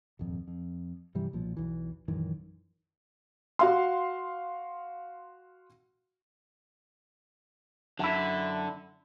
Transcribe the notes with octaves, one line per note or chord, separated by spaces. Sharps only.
D#1 G#1 F2
F2
G2 C3 E3 G3
B1 A#2 F3
B1 E2 E3
A#1 F#2 D#3 E3
F#4 F5 C6
F#2 D3 E4